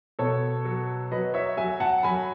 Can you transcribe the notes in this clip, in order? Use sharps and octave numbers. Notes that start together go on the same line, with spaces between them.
B2 A4 C#5
F#3
F#3 B4 D#5
C#5 E5
F#3 E5 G#5
F#5 A5
F#3 G#5 B5